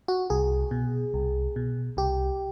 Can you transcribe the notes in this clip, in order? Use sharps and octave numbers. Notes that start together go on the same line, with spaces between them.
F#4
C2 G#4
B2
C2
B2
C2 G4